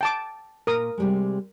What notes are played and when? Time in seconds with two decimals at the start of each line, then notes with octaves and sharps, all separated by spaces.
0.01 G5 A5 D6
0.67 A#2 A#4 D#6
0.98 C3 G3 G#3